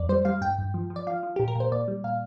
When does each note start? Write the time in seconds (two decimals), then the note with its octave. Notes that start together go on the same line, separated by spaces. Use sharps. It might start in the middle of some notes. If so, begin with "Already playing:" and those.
Already playing: F2 D5
0.09 G3 C5
0.25 G3 F5
0.41 G2 G5
0.58 G2
0.74 F3
0.90 F3
0.96 D5
1.07 F3 F5
1.23 F3
1.36 A#2 G4
1.48 A#4
1.55 A#2 C5
1.72 A#2 D5
1.88 G3
2.04 A#2 F5